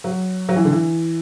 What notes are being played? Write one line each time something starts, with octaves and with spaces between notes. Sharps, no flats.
F#3
F#3
E3
D3
E3